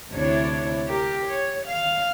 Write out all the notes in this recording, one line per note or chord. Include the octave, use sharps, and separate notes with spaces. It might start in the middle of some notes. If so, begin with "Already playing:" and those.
D2 C3 D4 E4 C#5
G4 A#4
C#5
F5